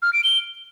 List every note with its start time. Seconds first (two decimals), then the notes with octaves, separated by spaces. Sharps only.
0.02 F6
0.13 D7
0.24 G7